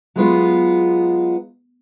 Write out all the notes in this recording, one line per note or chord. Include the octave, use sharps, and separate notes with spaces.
F#3 G#3 B3 F4